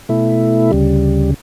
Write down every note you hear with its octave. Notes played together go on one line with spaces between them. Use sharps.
B2 A3 E4
D2 C#3 G3